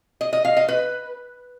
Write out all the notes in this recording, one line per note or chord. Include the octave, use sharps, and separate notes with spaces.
D#5
D#5
F5
D#5
B4